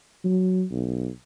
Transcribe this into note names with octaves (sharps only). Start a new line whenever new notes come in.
F#3
B1